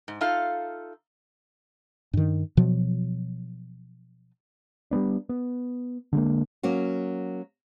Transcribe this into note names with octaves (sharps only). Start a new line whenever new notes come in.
G#2
D#4 F4 A4 E5 F5
G2 D#3
B2 F3 F#3
G3 A#3 B3 D4
B3
D3 G#3 A#3
F#3 A#3 C#4 F#4